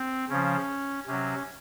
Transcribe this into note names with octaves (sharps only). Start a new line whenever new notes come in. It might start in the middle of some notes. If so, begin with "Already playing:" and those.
Already playing: C4
C#3 F3 C#4
C3 F#3 C#4